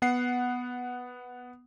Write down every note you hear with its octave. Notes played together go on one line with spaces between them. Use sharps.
B3 F#5 C7